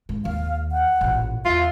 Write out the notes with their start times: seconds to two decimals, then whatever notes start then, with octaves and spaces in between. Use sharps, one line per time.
0.09 G#2
0.25 D#2 F5
0.72 F#5
1.01 A1 A#2
1.45 E2 F4 E5